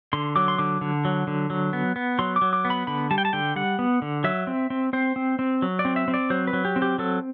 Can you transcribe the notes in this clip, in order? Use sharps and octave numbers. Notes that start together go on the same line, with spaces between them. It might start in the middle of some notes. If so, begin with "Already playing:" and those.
D3 C6
F#3 D6
C6
D3 D6
D3
F#3
D3
F#3
B3
B3
F#3 C6
D6
F#3
D6
B3
B5
D3 B5
G3 A5
G5
A5
D3 G5
G3 F#5
B3
D3
F#3 E5
C4
C4
C4 C5
C4
C4
F#3
D5
C4
E5
C4
D5
F#3 C5
B4
F#3
G4
C4
G4
F#3 A4